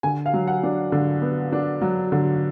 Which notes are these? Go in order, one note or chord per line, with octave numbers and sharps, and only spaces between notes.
D3 G#5
F5
F#3
F#5
D4
D3
B3
D4
F#3
D3